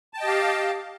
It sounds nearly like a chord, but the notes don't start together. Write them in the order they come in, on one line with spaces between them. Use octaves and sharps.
A5 G5 D#5 G4 F5